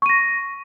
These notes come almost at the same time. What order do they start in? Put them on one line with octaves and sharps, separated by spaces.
C#6 D#7 A#6